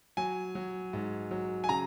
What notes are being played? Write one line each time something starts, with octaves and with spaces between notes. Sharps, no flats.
F#3 G#5
F#3
G#2
F#3
G#5
C#3 A#5